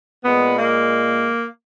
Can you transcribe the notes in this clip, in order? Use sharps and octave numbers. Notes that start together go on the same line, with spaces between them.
A#2 G#3 B3
A#3